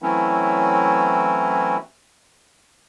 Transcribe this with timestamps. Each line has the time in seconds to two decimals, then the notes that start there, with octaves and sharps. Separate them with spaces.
0.02 E3 F#3 A3 C4 C#4 E4